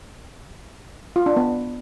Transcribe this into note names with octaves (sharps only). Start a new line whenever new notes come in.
F4
D4
B3